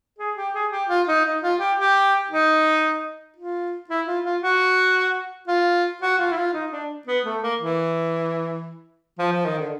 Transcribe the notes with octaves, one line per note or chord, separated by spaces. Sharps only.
G#4
G4
G#4
G4
F4
D#4
D#4
F4
G4
G4
D#4
F4
E4
F4
F4
F#4
F4
F#4
F4
E4
F4
D#4
D4
B3
A3
A#3
E3
F3
F3
D#3
D3